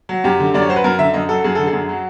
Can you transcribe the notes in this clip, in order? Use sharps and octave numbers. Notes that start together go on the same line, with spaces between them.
F#3
F#2 G4
D3
F#2 D5
C#5
F#3 C5
B4
F#2 A#4
D3 E5
F#2 D#5
F#3 A4
F#2 G#4
D3 A4
G#4
F#2
F#3